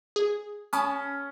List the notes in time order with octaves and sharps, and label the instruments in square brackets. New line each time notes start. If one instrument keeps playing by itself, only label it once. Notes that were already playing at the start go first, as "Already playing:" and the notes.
[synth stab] G#4
[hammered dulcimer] C#4 [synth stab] A5 B5 D#6